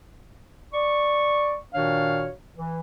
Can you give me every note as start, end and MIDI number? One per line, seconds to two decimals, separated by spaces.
0.73 1.55 74
0.73 1.55 85
1.74 2.29 46
1.74 2.29 51
1.74 2.29 62
1.74 2.29 66
1.74 2.29 73
1.74 2.29 77
2.55 2.79 52